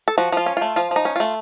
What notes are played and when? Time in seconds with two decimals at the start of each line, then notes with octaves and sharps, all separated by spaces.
0.08 A4
0.18 F3 F#4
0.32 F3 F4
0.46 C#4
0.57 A3 F4
0.76 F3 F4
0.91 F3 D#4
1.05 C#4
1.16 A3 F4